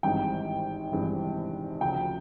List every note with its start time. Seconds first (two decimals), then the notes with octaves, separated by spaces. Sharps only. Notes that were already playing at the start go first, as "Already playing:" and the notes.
0.03 G#1 G2 E3 G#3 C4 G5
0.92 G#1 G2 E3 G#3 C4
1.81 D2 C#3 F3 G5